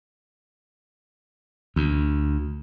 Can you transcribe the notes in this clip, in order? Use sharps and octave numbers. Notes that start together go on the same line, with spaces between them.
D2